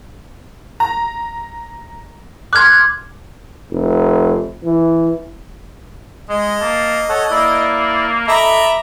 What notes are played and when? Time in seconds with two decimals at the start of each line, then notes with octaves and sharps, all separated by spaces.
0.80 A#5
2.53 C6 D6 F6 F#6 G#6
3.71 F1
4.64 E3
6.29 G#3 D#5
6.61 A#3 A5
7.09 A4 C#5 F#5
7.31 A#3 E4 D5
8.28 A4 D#5 E5 A#5 B5 D6